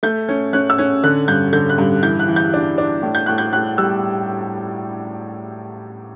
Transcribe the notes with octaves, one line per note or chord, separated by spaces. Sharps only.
A3 G6
C#4
C#4 F#6
E6
C#4
D3 F#6
G2 G6
D3 G6
F#6
G2
E3 G6
F#6
E3
G6
D4
D4
A2
G6
A2 F#6
G6
A2 F#6
G3 E6